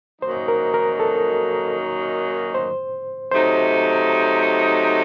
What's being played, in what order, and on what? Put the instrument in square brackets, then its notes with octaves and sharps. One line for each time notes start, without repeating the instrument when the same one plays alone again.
[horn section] F#2 D#3 F#3 A#3 D#4 [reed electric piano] C5
[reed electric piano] A#4
A#4
A4
C5
[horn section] C3 F#3 A3 D#4 [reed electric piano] C5